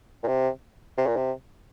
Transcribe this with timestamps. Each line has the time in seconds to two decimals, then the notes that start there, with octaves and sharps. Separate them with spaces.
0.23 A#2
0.28 C3
0.98 C3
1.07 A#2
1.17 C3